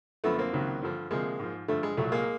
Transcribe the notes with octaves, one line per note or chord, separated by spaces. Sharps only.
F#2 D3 F3 A3 B3
A#3 C4
C#2 C3 D#3 F#3
G2 D3 F3
D2 C3 F3 G#3 A#3
G#2 F3
G2 D3 F3 A3
G#3
C2 A#2 F#3 A3
G#3 A#3